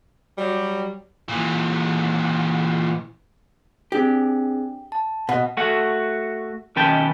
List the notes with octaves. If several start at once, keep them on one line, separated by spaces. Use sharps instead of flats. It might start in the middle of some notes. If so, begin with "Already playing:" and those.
F#3 G3
A#2 E3
C4 D4 G4 G#4
A5
B2 D#5 F#5
A3 F#4 F#5
B1 D#3 C#4 B4 G5 A5